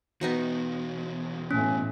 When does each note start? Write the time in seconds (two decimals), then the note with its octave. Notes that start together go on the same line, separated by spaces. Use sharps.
0.21 E2 B2 B3 D#4 F#4
1.51 A2 C#4